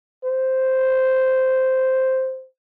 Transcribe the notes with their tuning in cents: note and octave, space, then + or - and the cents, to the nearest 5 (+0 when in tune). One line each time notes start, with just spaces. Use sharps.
C5 -5